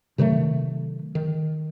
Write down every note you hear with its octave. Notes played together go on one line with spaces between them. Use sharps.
C3 D#3 F#3 A3
D#3